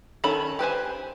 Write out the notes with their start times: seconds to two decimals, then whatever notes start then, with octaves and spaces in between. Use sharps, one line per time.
0.24 D#3 C#4 A4 C#5 B5
0.59 G4 B4 C5 G#5